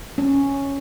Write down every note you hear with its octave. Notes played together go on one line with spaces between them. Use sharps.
C#4